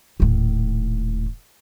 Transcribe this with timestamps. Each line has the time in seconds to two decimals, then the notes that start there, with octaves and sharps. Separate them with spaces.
0.20 D#1 A2